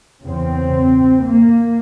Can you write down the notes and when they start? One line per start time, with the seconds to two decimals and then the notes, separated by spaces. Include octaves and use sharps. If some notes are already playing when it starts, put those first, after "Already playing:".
0.25 E2 C#3 C4
1.25 A#3